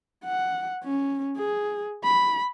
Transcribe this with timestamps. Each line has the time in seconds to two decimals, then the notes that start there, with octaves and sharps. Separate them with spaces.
0.25 F#5
0.84 C#4
1.37 G#4
2.04 B5